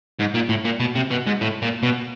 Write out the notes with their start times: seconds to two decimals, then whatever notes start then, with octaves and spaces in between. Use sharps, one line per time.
0.19 G#2
0.34 A#2
0.49 A2
0.65 A#2
0.80 B2
0.95 C3
1.10 B2
1.26 G#2
1.41 A2
1.62 A#2
1.83 B2